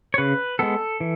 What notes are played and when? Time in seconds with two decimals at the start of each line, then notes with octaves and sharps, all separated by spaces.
0.14 C#5
0.18 C#3 B4
0.59 G#3 B3 A4
1.01 E3